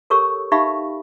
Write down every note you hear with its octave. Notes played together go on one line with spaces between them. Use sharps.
G4 A4 A#4 C#5 C#6 E6
D#4 G4 E5 F5 B5 C#6